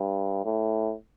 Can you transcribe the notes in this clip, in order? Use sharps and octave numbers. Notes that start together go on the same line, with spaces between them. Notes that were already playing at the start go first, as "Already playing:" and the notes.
Already playing: G2
A2